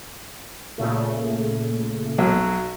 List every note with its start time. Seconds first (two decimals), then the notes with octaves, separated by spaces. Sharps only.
0.78 A#2 C#3 A3
2.18 B1 F#3